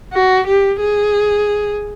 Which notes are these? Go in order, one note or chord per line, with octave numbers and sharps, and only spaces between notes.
F#4
G4
G#4